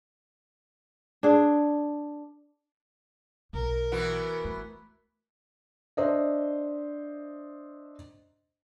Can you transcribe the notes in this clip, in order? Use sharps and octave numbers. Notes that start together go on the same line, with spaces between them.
D4 G#4
B1 A#4
E3 B3 F#4
A3
D4 C5 D#5 E5